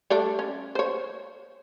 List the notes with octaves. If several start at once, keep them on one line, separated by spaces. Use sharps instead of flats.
G3 A3 D4
C#4
C5 C#5